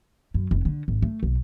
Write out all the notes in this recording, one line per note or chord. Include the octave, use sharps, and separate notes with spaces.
F#2
F1
D3
G#1
A3
B1